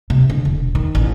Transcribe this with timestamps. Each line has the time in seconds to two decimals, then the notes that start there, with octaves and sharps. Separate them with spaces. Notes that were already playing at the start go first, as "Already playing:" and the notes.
0.10 C3
0.30 D3
0.45 E1
0.75 D#3
0.95 A1